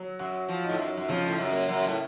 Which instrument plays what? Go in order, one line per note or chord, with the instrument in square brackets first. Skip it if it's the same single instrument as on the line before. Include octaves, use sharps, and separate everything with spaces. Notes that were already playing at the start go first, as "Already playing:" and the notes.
Already playing: [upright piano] F#3
[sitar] F#2 [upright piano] F#4
[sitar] F3
[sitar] A2 [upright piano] D#4
[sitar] F#2
F#2
[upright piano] C#3 [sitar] F3
[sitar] A2
F#2
[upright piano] A#3
[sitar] F#2
A2